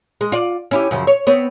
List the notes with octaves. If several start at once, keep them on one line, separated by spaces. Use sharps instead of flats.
G#3
F4 D5
C#4 E4 G4
F#2 C#3 F3
C#5
B3 C4 C#5